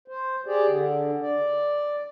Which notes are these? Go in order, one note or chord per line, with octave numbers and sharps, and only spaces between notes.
C5
G4 G#4 D5
D3
D5